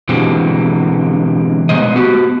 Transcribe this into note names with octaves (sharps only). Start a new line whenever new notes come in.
B2 D3 E3 G#3 C4 G4
G#3 B3 C5 D#5
B3 F#4 G4